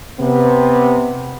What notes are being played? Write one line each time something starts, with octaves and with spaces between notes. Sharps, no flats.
C3 B3